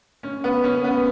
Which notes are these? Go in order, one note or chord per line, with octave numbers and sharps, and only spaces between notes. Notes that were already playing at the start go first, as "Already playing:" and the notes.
C#4
B3
C#4
B3